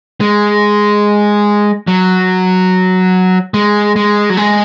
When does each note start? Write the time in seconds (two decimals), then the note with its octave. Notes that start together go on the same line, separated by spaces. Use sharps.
0.21 G#3
1.88 F#3
3.54 G#3
3.96 G#3
4.30 F#3
4.37 G#3